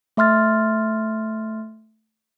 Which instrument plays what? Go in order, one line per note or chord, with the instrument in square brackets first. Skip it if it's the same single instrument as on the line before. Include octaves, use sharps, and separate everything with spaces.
[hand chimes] A3 E5 C6 F6 A6